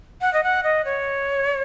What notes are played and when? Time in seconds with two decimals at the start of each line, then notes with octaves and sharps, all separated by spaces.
0.21 F#5
0.34 D#5
0.44 F#5
0.63 D#5
0.85 C#5